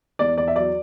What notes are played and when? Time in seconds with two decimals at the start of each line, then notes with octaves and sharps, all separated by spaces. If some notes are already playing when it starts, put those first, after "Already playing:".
0.19 E2 D5
0.38 E2 D5
0.48 E5
0.56 F#3 D5